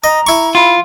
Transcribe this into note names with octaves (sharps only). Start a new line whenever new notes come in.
D#5 A#5
E4 C#6
F4 B5